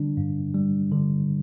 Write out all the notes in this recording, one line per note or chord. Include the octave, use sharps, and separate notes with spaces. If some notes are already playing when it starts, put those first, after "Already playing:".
Already playing: D3 G3 D4
G2
G3
D3